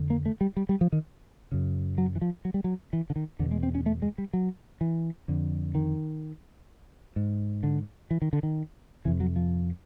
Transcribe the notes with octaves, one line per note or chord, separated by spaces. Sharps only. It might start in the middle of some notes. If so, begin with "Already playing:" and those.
Already playing: F2 D3
A#3
A3
G3
G3
G3
F3
D#3
F#2 C#3
F#3
E3
F3
F#3
G3
F#3
E3
D3
D#3
E2 B2 D3
G#3
C4
C#4
A3
G#3
G3
F#3
E3
F2 D3
D#3
G#2
D3
E3
D#3
D3
D#3
F2 C3 E3
F#3
F3